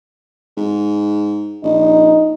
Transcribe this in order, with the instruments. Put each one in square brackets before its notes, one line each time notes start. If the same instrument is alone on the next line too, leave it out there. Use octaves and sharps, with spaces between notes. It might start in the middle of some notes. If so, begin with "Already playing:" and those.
[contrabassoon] G#2
[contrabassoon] A#1 [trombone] D#4